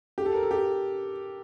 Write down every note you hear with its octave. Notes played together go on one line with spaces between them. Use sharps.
G4
A4
A#4
A4
G4